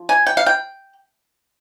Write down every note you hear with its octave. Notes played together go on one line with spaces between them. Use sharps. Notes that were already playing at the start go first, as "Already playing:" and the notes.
Already playing: F3
G#5
G5
F5
G5